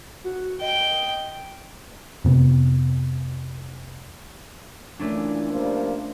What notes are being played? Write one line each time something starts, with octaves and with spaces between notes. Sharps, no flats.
F#4
D#5 G5
F2 C3 B3
A#2 E3 A3 C#4 D4
F3 G3 A#3